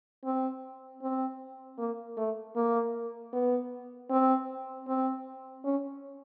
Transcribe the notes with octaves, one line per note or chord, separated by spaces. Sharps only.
C4
C4
A#3
A3
A#3
B3
C4
C4
C#4